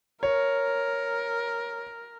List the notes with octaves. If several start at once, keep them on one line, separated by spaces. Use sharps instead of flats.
A#4 C#5